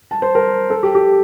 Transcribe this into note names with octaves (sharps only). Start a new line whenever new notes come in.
A5
C5
A#4
A4
G4
G4